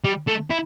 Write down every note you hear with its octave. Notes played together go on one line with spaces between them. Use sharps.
G3
A3
E4